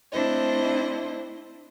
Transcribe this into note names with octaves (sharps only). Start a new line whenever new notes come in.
A3 C4 D4 E4 C5 D#5